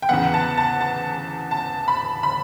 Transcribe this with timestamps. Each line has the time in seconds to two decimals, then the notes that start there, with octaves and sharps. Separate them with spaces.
0.02 G5
0.09 E2 C#3 E3 B3 F#5
0.34 A5
0.57 A5
0.81 A5
1.51 A5
1.88 B5
2.23 B5